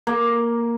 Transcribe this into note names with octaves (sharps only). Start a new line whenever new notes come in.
A#3